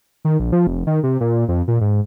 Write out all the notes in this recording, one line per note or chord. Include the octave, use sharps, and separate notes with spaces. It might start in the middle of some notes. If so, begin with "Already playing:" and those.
D#3
A#1
F3
F1
D#3
C3
A#2
F2
A#2
G#2